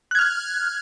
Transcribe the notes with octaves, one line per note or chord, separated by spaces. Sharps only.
F6 F#6 G#6